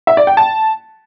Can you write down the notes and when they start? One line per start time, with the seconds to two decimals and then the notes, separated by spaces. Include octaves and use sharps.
0.07 E5
0.17 D5
0.27 G5
0.37 A5